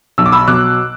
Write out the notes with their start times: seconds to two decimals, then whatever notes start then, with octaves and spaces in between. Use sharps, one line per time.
0.18 B1 E6
0.26 D6
0.32 B5 E6
0.48 B2 F#3 D6 F#6